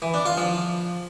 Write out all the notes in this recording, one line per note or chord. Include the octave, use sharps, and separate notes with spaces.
E3
D4
F4
F3